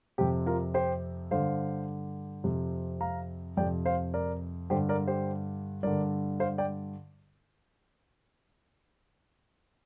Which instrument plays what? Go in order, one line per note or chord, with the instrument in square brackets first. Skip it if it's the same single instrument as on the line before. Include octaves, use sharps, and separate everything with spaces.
[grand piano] F2 C3 G4
F4 A#4
G4 C5
G2 D3 C5 F5
F2 C3
F5 A#5
F2 C3 D5 G5
C5 F5
A#4 D5
G2 D3 G4 C5
A#4 D5
G4 C5
G2 D3 A#4 D5
C5 F5
D5 G5